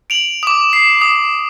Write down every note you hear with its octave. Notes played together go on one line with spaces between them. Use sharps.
D7 F7 F#7
D6 D#6
C7
D#6